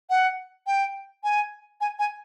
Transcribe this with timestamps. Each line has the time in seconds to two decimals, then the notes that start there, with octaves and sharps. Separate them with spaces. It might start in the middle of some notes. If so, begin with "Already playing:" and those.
0.10 F#5
0.67 G5
1.24 G#5
1.81 G#5
1.99 G#5